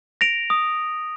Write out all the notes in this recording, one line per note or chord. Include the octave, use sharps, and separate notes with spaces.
A#6 D7 F7
D#6